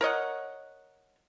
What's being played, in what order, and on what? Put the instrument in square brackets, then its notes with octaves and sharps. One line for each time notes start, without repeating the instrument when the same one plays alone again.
[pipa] A#4 C#5 D#5 F#5